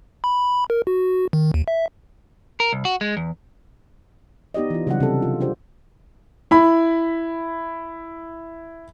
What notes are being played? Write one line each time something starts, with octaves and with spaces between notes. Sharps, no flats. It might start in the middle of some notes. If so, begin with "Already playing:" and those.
B5
A#4
F#4
D#3
D#2
E5
A#4
C2
F#4
G#3
E2
B3 D#4 G4 D5 D#5
E3 F4
C#3 F#3 G3 D4 F#5
C3 A4
F4
D4 F4 G4 C5
E4 B5